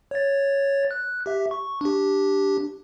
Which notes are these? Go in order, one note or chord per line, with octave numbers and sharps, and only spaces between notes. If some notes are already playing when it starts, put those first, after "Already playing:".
C#5 A6
F#6
G4 E5
C#6
D4 G4